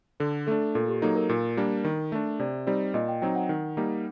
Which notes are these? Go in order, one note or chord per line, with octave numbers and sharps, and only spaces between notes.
D3 A4
A3 D4 A4
A#2 A4
G4
F#3 A#3 D#4 A4
A#4
A#2
G3 A#3 D4
D#3
A3 D4
C3 D5
G3 C4 D#4 D5
A#2 D#5
G5
F#3 C4 D#4 G5
F#5
D#3
G3 A#3 D#4